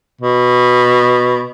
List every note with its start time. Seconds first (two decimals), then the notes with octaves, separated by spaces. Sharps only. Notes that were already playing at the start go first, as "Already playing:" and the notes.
0.22 B2